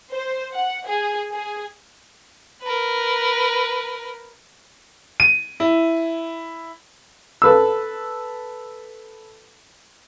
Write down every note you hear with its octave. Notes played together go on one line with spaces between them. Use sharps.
C5
F#5
G#4
G#4
A#4 B4
D#7
E4
A4 B4 E6